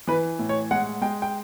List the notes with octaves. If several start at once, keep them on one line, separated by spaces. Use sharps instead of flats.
E3 B4
A2
C#5
G#3 F#5
G#3 G5
G5